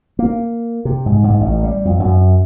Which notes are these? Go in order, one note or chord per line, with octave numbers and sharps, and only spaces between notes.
A#3
C3
G#2
G#2
A1
G3
F2
F#2